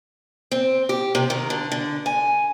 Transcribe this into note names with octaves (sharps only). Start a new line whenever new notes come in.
C4
G4
C3
D#3
D3
D3
G#5